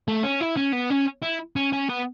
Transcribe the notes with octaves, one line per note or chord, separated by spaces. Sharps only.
A3
C#4
E4
C#4
B3
C#4
E4
C#4
C#4
B3